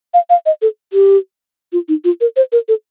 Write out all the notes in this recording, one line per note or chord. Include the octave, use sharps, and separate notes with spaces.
F5
F5
D#5
A4
G4
F4
D#4
F4
A#4
C5
A#4
A4